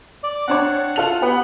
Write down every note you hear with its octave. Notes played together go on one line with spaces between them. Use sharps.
D5
C4 D4 C#5 F#5
F4 A4 F7
B3 G4 B4 F#5